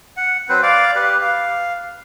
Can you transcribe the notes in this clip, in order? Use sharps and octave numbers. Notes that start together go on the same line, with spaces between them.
F#5
F#3 C4 B4 C5
D5 F5 D6
G4 B4
F5